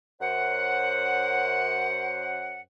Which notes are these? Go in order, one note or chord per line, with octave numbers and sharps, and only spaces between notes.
F#2 C5 F#5